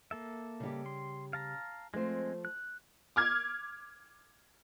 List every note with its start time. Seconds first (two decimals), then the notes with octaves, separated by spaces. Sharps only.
0.11 A#3 A4 E5
0.60 C#3 G3 G4
0.86 C6
1.33 F5 A5 A#5
1.94 F3 G#3 A3 C4 C5
2.45 F#6
3.16 D6 F6 G#6